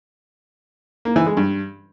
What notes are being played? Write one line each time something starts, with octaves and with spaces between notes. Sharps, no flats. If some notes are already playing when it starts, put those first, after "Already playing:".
A#3
E3
G#3
G2